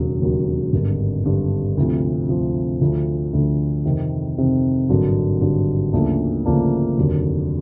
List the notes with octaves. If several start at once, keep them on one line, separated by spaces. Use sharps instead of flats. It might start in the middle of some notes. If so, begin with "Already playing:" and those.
Already playing: E1 D#2 C#3 F#3
E1 D#2 C#3 F#3
G#1 G2 D3
G#1 G2 D3
D2 C3 F3
D2 C3 F3
D2 D3 F3
D2 D3 F3
F2 C3 D#3
F2 C3 D#3
G#1 G2 D3 F#3
G#1 G2 D3 F#3
D2 C#3 F3 A#3 D4
D2 C#3 F3 A#3 D4
F1 D#2 D3 F#3